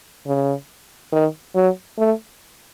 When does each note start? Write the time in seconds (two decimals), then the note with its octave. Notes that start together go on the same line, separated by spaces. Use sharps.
0.27 C#3
1.12 D#3
1.55 F#3
1.98 A3